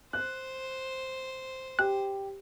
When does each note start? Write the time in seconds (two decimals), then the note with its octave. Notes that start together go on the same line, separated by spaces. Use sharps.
0.13 C5 F#6
1.79 G4 F#6